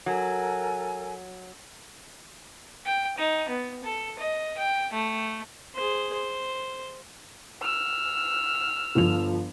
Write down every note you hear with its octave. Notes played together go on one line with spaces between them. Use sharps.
F#3 A4 A#4 G#5
G5
D#4
B3
A4
D#5
G5
A3
G#4 C5
C5
E6 F6
G1 F3 F7